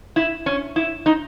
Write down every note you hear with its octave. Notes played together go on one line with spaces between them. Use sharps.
E4
C#4
E4
D#4